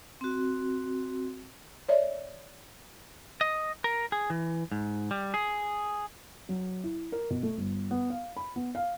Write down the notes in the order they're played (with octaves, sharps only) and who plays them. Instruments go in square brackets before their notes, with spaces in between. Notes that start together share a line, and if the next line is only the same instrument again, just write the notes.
[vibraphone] C4 F#4
[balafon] C#5 D5 E5
[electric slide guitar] D#5
A#4
G#4
E3
G#2
G3
G#4
[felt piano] F#3
E4
A#4
B2
A3
G1
B3
F5
B5
B3
F5